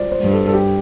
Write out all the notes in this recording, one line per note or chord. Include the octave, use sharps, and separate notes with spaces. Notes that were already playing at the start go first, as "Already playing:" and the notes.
Already playing: G3 F4 C5 D5
C5
G2
A4
A4
G4